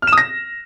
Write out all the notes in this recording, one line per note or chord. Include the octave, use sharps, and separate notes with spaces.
F6
E7
D#6
A#6